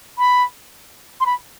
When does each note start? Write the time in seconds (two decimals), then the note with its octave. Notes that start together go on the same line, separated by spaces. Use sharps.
0.18 B5
1.20 C6
1.26 B5